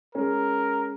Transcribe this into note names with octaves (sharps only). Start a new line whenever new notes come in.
G#3 C#4 A#4